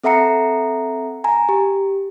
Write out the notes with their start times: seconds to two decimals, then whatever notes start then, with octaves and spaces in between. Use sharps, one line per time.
0.04 C4 A4 E5 F#5 A#5 C#7
1.24 G#5 A#5
1.49 G4